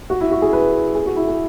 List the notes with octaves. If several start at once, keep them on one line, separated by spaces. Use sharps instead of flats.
F#4
E4
F#4
G#4
B4
G#4
F#4
E4
G#4